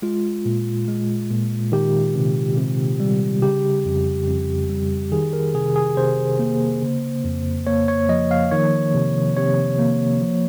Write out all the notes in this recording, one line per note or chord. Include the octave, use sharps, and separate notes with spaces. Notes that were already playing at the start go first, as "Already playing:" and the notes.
G#3 F4
A#2
G#3
A#2
D#3 G4
C3
C3
G3
C#3 G4
F2
F2
G3
D#3 G#4
A#4
C3 G#4
G#4
C3 C5
A#3
C#3
F2
A#3 C#5
C#5
F3 D#5
F5
D#3 C#5
C3
C3 C#5
A#3
F3